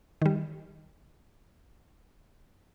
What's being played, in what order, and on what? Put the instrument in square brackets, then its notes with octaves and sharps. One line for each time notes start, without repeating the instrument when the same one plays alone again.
[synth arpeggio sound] D#3 G3